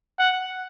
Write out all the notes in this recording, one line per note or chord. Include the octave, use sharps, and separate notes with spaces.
F#5